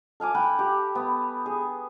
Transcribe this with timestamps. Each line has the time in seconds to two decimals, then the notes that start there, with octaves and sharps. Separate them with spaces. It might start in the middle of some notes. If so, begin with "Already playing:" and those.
0.20 A4 F5 G#5 D6
0.35 F#5 G5 B5
0.59 G4
0.95 B3
1.46 G#4